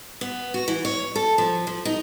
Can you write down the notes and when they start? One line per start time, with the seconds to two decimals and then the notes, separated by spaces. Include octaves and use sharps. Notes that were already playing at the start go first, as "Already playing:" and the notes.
0.21 B3
0.54 F#4
0.68 E3
0.85 C#5
1.16 A4
1.38 F3
1.67 F3
1.85 D#4